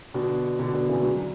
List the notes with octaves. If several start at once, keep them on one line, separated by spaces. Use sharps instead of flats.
B2 D3
B2 D3
B2 D3
C#3 E3
D3 F#3